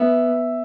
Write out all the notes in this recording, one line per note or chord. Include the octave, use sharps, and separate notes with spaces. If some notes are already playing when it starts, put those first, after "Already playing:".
Already playing: B3 E5